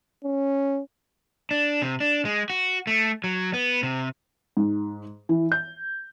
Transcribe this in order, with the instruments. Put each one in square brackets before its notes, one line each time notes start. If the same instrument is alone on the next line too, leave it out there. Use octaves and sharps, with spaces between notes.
[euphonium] C#4
[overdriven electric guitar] D4
C3
D4
G#3
F#4
A3
F#3
B3
C3
[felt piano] G#2
E3
G6